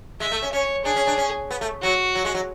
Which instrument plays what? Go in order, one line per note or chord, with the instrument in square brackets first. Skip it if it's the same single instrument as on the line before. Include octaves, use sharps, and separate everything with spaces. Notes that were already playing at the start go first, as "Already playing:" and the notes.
[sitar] G#3 [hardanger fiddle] E5
[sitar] A3
C#4
[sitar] C#4 [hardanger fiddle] C#5
[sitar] D4 [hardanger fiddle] G#4
[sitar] C#4
D4
C#4
B3
A3
[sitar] F#3 [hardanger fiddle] F#4
[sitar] F#3
G#3
F#3